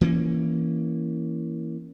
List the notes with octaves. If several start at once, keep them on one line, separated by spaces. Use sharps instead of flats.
E3 A#3 C#4